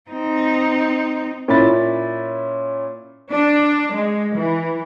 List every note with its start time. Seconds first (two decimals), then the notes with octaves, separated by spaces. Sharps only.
0.11 C4 D#4
1.48 A#2 C#4 E4 B5 A6
3.30 D4
3.93 G#3
4.37 E3